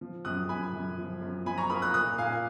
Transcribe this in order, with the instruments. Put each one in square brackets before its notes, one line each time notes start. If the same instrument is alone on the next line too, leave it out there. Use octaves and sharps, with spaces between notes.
[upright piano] F3
F#2 D#6 F#6
F#2 G#5 B5
F#2
F3
F#2
F3 G#5 B5
A#5 C#6
A#3 B5 D#6
D#6 F#6
A#2 D#6 F#6
A#2 F5 G#5